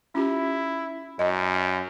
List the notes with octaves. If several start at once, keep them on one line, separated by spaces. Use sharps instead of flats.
C#4 E4 F4 G4
F#2 D#5